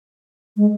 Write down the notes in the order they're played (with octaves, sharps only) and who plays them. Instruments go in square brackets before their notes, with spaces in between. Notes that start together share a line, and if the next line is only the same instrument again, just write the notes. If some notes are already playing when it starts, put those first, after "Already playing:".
[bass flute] G#3